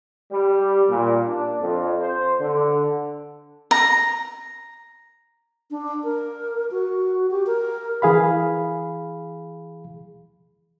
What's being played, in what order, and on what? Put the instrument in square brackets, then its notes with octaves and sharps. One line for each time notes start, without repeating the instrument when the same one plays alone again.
[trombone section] G3
A#2
D4
F2
C5
D3
[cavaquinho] A#5
[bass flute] D4
A#4
F#4
G4
A#4
[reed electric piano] E3 G#4 F5 B5